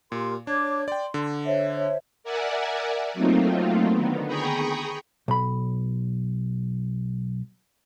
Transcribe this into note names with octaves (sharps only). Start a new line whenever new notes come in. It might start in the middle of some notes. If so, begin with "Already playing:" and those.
A#2 G4 A#4 C6
D4 C#5 D6 G#6
D5 G5 C6
D3
C5 C#5 E5
A#4 D5 E5 F#5 G#5
F#3 A3 A#3 C4 D#4 F4
D3 D#3 B3
G#4 G5 A#5 B5 C#6 D#6
B1 B5